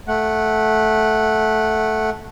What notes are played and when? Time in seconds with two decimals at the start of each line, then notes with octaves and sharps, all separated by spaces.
0.08 A3 F#5